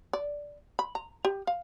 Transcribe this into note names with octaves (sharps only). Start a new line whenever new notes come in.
D5
B5
A#5
G4
F5